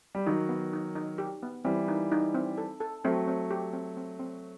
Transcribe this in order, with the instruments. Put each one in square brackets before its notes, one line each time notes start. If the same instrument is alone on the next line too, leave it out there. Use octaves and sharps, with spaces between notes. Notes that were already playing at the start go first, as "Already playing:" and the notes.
[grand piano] G3
[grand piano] D#3 F#3 [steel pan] D#4
[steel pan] B3
D#4
D#4
G4
B3
[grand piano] E3 G3 [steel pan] C4
[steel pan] D#4
D#4
C4
A4
A4
[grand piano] F#3 A3 [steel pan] C4
[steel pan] C4
G4
C4
C4
C4